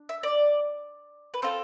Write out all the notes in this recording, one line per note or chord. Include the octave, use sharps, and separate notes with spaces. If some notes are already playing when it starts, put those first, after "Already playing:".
Already playing: D4
E5
D5
B4
C4 F4 A4 C5